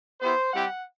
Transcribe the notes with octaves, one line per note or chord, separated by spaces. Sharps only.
B3 E4 G4 C5
G3 C4 E4 G4 F#5